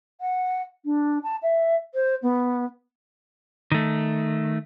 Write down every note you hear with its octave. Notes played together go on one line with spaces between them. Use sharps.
F#5
D4
A5
E5
C5
B3
D#3 A3